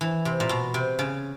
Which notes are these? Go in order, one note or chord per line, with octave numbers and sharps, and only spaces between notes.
E3
C3
A#2
B2
C3
C#3